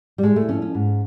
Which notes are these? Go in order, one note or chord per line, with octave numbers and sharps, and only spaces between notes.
G3
A2 G#3
A3
F3 C#4
C#4
G#2